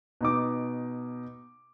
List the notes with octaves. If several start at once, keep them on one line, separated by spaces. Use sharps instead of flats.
B2 D#4 D6